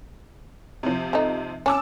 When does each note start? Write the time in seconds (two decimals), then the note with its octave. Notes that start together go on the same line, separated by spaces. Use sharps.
0.83 C3 F3
1.13 A3 D#4
1.66 C#4 A5 D6 E6